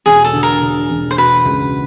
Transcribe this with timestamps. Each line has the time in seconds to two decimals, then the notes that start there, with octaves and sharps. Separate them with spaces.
0.06 E1 G#4
0.24 A4
0.33 D3
0.43 A#4
0.61 D3
0.90 E1
1.11 C5
1.17 B2 B4
1.46 C#2